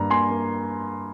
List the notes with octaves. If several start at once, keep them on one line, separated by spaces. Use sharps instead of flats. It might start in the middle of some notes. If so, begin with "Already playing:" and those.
Already playing: G2 A#3 A#5
A#3 G#5 C6
A#3